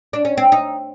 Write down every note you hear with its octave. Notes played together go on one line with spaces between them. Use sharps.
D4
C#4
C4
D#4